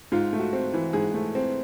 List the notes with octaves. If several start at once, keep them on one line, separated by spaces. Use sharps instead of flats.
G#2 F4
A3
F#4
C4
E3
G#2 G#4
A3
C4